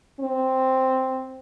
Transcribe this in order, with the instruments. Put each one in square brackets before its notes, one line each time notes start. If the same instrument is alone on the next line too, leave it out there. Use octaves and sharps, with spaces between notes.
[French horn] C4